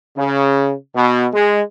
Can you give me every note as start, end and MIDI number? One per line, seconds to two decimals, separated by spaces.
0.17 0.73 49
0.96 1.27 47
1.34 1.63 56